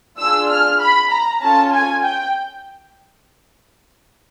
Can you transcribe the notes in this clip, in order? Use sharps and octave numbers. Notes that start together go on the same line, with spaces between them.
D4 F4 G#4 E6
F6
B5
A#5
C#4 F4 A4 A5
G#5
G5